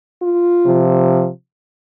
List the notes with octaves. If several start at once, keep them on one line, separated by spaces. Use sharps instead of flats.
F4
C3 F3